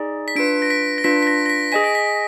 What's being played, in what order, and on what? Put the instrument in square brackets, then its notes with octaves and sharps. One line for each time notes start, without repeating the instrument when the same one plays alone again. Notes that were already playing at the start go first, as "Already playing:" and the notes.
Already playing: [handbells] D#4 G#4 D5
[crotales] B6
[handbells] D4 F4 B4 [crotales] D7
[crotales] A#6
B6
A#6
[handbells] D4 F4 B4 [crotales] B6
[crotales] B6
A#6
A#6
B6
[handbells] G#4 D#5 G#5 [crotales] B6
[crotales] A#6
B6